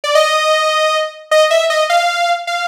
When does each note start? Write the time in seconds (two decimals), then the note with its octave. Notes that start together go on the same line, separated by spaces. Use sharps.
0.04 D5
0.15 D#5
1.31 D#5
1.51 E5
1.70 D#5
1.90 F5
2.47 F5